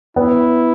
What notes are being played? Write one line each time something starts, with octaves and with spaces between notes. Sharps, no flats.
B3 E4